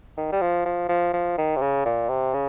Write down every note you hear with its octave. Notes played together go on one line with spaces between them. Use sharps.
D#3
G3
F3
F3
F3
F3
D#3
C3
C#3
A#2
C3
C#3